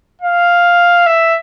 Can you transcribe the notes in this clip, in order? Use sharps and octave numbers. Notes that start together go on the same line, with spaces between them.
F5
E5